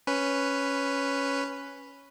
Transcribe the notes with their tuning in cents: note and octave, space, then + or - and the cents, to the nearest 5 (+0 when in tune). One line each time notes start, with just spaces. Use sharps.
C#4 +0 B4 +0